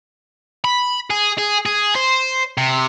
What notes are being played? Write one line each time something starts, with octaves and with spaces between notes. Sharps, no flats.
B5
G#4
G#4
G#4
C5
C3